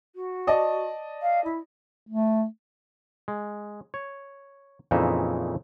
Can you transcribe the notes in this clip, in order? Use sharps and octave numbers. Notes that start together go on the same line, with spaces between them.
F#4
D5 D#5 A5
F5
E4
A3
G#3
C#5
F2 A#2 C#3 E3 D#4 E5